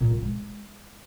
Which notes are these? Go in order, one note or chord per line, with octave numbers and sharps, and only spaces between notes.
A#2
E3
G#3